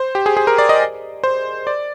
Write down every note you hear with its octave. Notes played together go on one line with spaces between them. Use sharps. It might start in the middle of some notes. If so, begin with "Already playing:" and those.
Already playing: C5
G4
G#4
G#4
A#4
D5
D#5
C5
D5